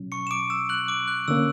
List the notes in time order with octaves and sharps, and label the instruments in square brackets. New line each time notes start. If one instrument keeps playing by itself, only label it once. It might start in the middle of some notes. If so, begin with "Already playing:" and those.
Already playing: [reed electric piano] B2 F#3 C#4
[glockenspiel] C#6 C#7
E7
D6 D7
E6 E7
F#6 F#7
D6 D7
F#6
[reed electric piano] D3 A#3 C#4 [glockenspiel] E6